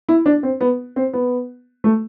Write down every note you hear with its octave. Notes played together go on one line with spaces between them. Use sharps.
E4
D4
C4
B3
C4
B3
A3